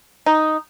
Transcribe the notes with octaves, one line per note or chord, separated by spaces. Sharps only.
D#4